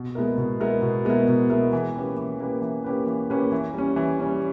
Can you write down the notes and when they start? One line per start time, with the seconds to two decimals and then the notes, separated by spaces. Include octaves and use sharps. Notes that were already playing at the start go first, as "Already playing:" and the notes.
Already playing: B2
0.15 G#3 B3 E4 A#4
0.37 B2
0.60 G#3 B3 E4 A#4
0.82 B2
1.05 G#3 B3 E4 A#4
1.28 B2
1.50 G#3 B3 E4 A#4
1.73 E3
1.95 A#3 C#4 G4 B4
2.17 E3
2.40 A#3 C#4 G4 B4
2.62 E3
2.84 A#3 C#4 G4 B4
3.07 E3
3.30 A#3 C#4 G4 B4
3.52 E3
3.74 G3 C#4
3.96 E3
4.20 G3 C#4